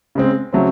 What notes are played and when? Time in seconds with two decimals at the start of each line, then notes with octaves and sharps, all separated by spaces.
0.15 C#3 G#3 C4
0.53 C#3 F#3 A3 C4